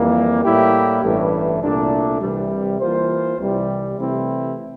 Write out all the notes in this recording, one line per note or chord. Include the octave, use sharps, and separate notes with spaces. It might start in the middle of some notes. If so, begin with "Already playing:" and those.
Already playing: F2 E3 G3 A#3
A2 G3 A#3 E4 G4
A1 G2 E3 A3
C2 A#2 A3 D4
C2 C3 E3 G3
E3 A#3 F4 C5
C2 C3 E3 G3
C3 E3 A3 C4 E4